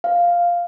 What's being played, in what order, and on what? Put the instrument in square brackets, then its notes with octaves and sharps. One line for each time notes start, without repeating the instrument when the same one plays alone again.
[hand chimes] F5